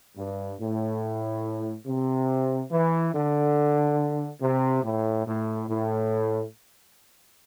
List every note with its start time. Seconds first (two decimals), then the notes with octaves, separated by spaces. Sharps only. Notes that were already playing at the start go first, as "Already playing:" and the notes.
0.17 G2
0.60 A2
1.86 C3
2.71 E3
3.14 D3
4.42 C3
4.84 A2
5.27 A2
5.69 A2